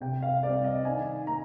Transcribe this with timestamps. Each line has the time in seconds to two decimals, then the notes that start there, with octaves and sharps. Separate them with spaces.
0.01 C3 G5
0.22 F5
0.43 G3 C4 D5
0.64 D#5
0.85 D#3 G#5
1.27 A#3 A#5